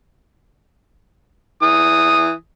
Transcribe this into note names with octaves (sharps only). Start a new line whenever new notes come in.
E3 D#6